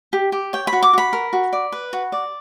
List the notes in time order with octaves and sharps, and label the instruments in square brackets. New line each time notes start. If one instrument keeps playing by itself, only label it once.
[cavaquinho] G4
G4
C#5 G5
B5
F#4
D6
F#4 B5
A#4
F#4
D5
B4
F#4
D5